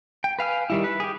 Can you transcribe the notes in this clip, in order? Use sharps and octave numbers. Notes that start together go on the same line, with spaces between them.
G5
B4 F5 G#5 F6
D#3 G3 E4
B4
G4 G#4